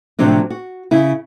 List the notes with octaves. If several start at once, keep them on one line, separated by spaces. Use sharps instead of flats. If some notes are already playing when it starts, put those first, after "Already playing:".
A2 C3 F3 F#3 C4 D4
F#4
C#3 E4